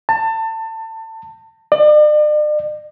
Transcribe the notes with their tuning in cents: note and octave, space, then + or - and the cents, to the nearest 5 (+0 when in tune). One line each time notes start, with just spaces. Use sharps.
A5 +25
D5 +40